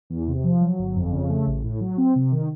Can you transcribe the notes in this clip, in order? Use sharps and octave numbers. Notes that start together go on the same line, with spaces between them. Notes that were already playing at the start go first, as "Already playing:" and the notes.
E2
C3
F3
F#3
G1
F2
C#3
A3
A1
A2
F#3
C4
C3
D#3